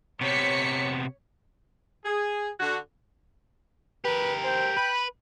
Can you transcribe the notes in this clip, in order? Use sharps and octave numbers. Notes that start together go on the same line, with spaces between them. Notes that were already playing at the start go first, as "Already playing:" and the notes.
C3 B3 C#5 B6 C#7
G#4
D3 F#4
G4 A#4 B4
C5 G5
B4 B5